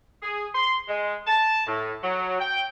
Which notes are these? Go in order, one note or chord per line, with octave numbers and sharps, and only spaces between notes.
G#4
C6
G#3
A5
A2
F#3
G5